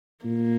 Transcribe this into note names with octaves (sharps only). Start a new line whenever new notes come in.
A#2 A#3